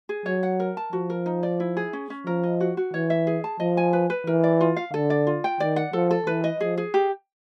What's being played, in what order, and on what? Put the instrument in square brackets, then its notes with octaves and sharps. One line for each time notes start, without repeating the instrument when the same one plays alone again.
[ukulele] G#4
[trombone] F#3 [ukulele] C#5
[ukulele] F#5
A#4
A5
[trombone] F3 [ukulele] F#4
[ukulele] A#4
D#4
D5
E4
G#4
C#4
C#4
[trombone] F3 [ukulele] A#4
[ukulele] D#5
F#4
F#4
[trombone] E3 [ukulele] C#5
[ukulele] E5
G#4
A5
[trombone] F3 [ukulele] D#5
[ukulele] G#5
B4
B4
[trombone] E3 [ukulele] A#4
[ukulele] D5
F4
F5
[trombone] D3 [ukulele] A4
[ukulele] D5
F4
G5
[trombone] D#3 [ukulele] D5
[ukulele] F#5
[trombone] F3 [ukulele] A4
[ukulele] A4
[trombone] E3 [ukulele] B4
[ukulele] D#5
[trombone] F3 [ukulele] G#4
[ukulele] G#4
G4